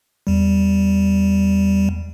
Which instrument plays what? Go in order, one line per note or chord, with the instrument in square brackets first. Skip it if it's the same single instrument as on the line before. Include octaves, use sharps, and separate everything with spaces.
[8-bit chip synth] E2 G3